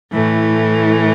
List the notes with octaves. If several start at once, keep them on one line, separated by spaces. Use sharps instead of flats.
A2 E3 A3